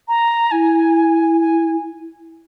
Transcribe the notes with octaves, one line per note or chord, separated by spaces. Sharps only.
A#5
E4 G#5
G#5